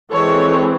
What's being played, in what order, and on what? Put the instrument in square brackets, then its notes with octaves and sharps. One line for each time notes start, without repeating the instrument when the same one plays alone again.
[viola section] E3 G#3 C4 A4 C#5